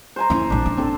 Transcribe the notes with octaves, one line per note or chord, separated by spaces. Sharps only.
C5 G#5 A#5
C#4 E4
A#1 C4 D4
C#4
C4 D4 A4